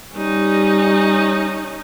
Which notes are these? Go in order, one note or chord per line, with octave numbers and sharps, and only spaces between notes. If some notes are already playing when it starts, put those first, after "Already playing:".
G3 C#4 D#4